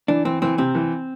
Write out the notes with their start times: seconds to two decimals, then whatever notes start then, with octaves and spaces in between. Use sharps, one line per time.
0.08 E3 D4
0.25 E3 C4
0.42 E3 C4
0.58 C3 C4
0.75 E3